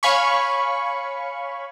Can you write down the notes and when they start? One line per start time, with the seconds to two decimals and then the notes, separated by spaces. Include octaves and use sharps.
0.03 C#5 F5 G#5 B5 C#6